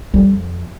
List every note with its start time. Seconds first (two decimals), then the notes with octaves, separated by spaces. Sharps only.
0.14 F2 G3